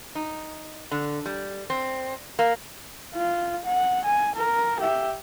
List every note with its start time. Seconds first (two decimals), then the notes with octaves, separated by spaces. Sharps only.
0.15 D#4
0.91 D3
1.26 G3
1.70 C4
2.39 A#3
3.15 F4
3.66 F#5
4.05 G#5
4.36 A#4
4.81 G4 E5